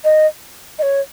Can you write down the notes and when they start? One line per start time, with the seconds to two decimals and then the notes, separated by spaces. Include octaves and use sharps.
0.04 D#5
0.79 D#5
0.82 C#5